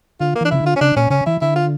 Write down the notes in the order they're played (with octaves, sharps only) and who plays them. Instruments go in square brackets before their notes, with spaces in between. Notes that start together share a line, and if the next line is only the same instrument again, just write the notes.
[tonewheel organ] D3 [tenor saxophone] F4
[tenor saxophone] A#3
[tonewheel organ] E3 [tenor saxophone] D4
[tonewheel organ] C#3 [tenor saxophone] E4
[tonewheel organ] D3 [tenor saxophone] F4
[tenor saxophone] C#4
[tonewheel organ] C#3 [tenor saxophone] D4
[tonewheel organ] A#2 [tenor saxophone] C#4
[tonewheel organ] C#3 [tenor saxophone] C#4
[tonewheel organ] E3 [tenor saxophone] E4
[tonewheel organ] D3 [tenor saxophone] E4
[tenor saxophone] F4